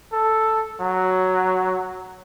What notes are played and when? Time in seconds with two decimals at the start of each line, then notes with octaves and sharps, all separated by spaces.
0.13 A4
0.81 F#3